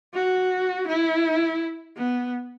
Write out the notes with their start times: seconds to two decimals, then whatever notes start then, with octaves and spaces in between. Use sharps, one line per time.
0.14 F#4
0.87 E4
1.97 B3